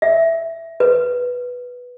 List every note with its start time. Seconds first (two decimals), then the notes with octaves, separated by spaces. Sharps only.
0.02 E5
0.80 B4